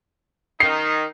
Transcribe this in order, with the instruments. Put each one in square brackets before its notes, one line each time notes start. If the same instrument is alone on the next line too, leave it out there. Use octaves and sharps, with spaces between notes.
[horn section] D#3 D#4 [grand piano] C7